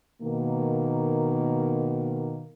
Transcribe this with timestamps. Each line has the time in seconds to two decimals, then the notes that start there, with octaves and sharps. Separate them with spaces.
0.22 B2 D#3 A#3